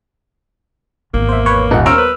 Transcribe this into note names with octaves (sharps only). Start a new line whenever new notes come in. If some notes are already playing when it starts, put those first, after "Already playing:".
G#1 E2 A#3
C5 E5
B4 C#5
D#1 D#4 F#5
B3 C#4 A#4 C5 C#5 E6 F6 D7
B4